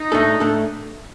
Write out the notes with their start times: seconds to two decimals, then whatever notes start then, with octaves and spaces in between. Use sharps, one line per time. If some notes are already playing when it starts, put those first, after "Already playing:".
Already playing: D#4
0.12 A2 A3 D4 A4
0.40 A2 A3 D4 A4